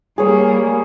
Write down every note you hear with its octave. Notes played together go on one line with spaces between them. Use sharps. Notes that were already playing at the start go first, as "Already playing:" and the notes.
G3 A#3 G#4 C#5